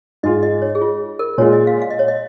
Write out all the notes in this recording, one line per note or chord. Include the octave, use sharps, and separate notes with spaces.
G#2 G#3 F4 D#5
D#5
C#5
G#4
F4
A#4
A#2 G#3 F4 C#5
D#5
F5
F5
D#5
C#5
D#5